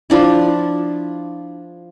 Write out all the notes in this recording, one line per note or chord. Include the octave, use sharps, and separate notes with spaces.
F3 D4 E4